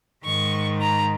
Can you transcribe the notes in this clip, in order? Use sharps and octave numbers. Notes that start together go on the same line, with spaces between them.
G#2 D#3 C#6
A#5